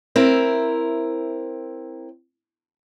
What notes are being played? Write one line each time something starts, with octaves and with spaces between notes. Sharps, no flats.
C4 E4 A#4